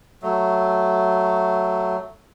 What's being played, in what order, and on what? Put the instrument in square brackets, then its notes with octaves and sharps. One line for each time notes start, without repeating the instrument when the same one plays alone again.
[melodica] F#3 A3